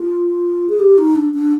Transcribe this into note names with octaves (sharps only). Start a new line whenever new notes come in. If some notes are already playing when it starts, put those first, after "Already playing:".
Already playing: F4
G#4
G4
D#4
D4
D4